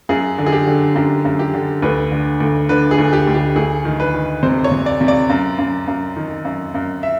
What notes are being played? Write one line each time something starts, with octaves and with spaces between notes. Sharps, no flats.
F#2 G#4
D3
G#4
G4
D3
F#2 G4
F#2
G4
D3
D2 B4
D3
D2
D3 B4
G#4
D2
G4
D2
G4
D2 G#4
D#3
B4
D#3
C3 C5
C#5
C3
D5
C3
D5
F#2
F#2
F#2
D#3
F#2
F#2
E5